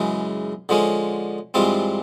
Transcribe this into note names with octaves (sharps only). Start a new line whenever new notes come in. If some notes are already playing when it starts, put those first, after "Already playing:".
Already playing: F#2 C#3 E3 G#3
D3 F3 G#3 C#4
G2 E3 G#3 C4 F4